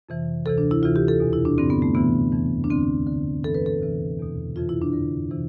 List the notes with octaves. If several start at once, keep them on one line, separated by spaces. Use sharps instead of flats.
F2 C3 E3
D2 C3 E3 A4
D4
E4
D2 C3 E3 F4
G4
A4
E2 B2
E4
D4
G2 D3 C4
B3
A3
D2 C3 E3 B3
F2 E3
D4
D2 D3 C4
D2 D3
G2 E3 A4
B4
A4
D2 C3 E3
E2 B2
F2 C3 E3 F4
E4
D4
G2 D3
C3 E3